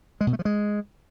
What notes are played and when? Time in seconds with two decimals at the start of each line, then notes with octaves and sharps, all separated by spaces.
0.21 G#3
0.27 B2
0.33 A3
0.39 F3
0.45 G#3